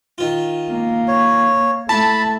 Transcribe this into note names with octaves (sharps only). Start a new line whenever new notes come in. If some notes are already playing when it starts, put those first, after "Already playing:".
D#3 F4
A#3
C#5
A3 E4 A5 B5